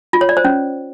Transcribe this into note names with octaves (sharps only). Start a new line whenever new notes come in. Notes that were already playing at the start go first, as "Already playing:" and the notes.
F4
C#5
D5
C5
C#4